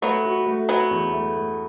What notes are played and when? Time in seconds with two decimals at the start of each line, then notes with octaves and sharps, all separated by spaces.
0.02 F#3 A3 B3
0.25 F#4
0.46 A3
0.69 F#3 B3 F#4
0.91 E2
1.13 A3
1.36 A3